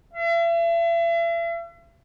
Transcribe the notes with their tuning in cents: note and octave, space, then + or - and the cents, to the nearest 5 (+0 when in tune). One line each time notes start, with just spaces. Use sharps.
E5 +40